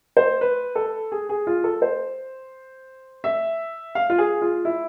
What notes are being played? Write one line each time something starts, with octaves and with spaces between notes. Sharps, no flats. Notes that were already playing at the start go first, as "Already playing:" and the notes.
C5
B4
A4
G#4
G#4
F4
A4
C5
E5
F5
F4
G#4
F4
E4